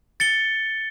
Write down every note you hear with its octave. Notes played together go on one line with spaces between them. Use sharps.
A6 C#7 G7